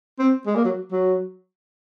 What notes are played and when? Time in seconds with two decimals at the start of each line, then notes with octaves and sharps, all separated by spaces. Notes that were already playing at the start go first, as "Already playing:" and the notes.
0.19 C4
0.46 G#3
0.55 A#3
0.65 F#3
0.92 F#3